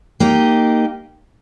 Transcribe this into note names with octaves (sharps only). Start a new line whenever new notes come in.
A#3 D#4 G4